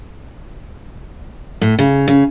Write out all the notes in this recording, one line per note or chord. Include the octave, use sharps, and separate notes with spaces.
A2
C#3
C#3